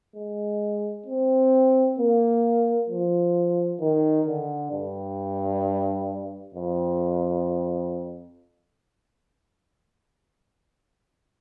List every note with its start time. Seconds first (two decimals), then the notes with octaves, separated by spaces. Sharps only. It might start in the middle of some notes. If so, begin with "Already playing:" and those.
0.16 G#3
1.06 C4
1.98 A#3
2.89 F3
3.80 D#3
4.27 D3
4.72 G2
6.55 F2